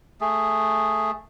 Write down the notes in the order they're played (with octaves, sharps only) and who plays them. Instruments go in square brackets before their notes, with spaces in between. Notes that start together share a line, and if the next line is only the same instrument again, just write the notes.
[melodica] A3 G#4